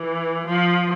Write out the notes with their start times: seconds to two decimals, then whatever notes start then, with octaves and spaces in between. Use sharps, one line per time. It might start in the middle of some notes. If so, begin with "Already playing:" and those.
Already playing: E3
0.47 F3